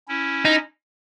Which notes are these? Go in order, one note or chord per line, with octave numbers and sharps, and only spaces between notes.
C#4 E4
D#4